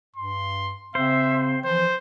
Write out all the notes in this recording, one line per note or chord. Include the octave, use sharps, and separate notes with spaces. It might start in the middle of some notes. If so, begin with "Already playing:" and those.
G2 C6
C#3 C4 C5 E5
E3 F3 C5